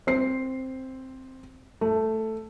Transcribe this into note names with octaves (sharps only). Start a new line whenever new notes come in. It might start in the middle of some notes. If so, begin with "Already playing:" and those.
C4 C7
A3